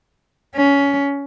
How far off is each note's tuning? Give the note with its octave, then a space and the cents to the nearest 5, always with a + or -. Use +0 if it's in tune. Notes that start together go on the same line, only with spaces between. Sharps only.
C#4 +20